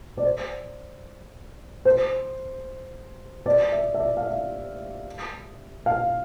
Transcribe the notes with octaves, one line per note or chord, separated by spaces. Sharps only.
D5
C5
C5
D5
E5
E5
D5
F5
E5
F5